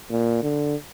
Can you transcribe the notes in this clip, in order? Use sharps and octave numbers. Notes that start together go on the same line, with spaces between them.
A#2
D3